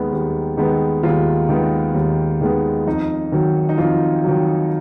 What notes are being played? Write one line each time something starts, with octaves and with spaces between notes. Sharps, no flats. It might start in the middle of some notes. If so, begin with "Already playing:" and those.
Already playing: D#2 D#3 G#3 B3
D#2
D#3 G#3 B3
D#2 F4
D#3 G#3 B3
D#2
D#3 G#3 B3
F2 D#4
D#3 F#3
D#4
F2 F4
D#3 F#3